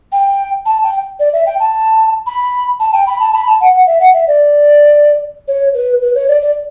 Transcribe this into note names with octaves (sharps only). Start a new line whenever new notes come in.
G5
A5
G5
D5
E5
G5
A5
B5
A5
G5
B5
A5
B5
A5
F#5
F#5
E5
F#5
E5
D5
C#5
B4
B4
C#5
D5
D5